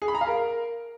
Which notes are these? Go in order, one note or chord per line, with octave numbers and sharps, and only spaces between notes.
G#4
B5
A#5
F5
A#4